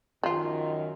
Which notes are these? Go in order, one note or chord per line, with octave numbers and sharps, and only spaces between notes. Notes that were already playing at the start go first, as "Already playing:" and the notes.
F#2 D#3 F3 F4